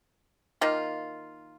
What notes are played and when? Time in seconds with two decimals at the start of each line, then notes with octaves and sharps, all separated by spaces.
0.61 D#3 A#3 F4